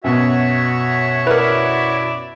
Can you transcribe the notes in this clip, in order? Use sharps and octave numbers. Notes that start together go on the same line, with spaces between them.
F#2 B2 F#4 C#5 E5
E4 A#4 B4 D5